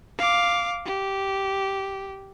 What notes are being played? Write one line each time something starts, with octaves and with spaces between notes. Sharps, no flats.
F5 D6
G4